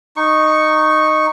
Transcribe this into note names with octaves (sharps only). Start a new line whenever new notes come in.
D#4 C#6